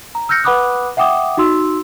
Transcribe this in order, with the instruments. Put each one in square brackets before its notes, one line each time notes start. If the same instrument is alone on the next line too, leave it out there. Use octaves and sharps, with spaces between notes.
[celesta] A#5
E6 F6 G6 A#6 C#7
B4 F#5 B5 D6 D#6 F#6
E5 F#5 G5 D6 D#6
D#4 F#4 C6 E6